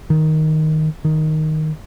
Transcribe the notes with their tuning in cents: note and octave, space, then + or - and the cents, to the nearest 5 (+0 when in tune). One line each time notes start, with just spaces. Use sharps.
D#3 +5
D#3 +0